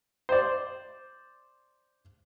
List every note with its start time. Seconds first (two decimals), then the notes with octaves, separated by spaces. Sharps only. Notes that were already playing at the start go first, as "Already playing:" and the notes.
0.29 C5 D5